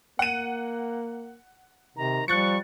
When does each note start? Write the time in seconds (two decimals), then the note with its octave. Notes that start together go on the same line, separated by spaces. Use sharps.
0.19 A#3 F#5 D#7
1.97 C3 D#3 A#5
2.28 F3 G3 C#6 F#6 A6 C#7